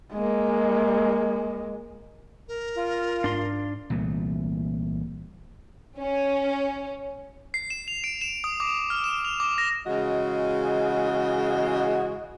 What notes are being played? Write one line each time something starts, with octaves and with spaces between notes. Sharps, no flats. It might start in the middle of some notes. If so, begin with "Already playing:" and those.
G#3 A#3
A#4
F4
G#2 D4 C6
C2 A#2 E3 A3
C#4
C7
E7
F7
D7
E7
D#6
D6
F6
E7
F7
D6
A#6
C#3 E3 G#3 F#4 D#5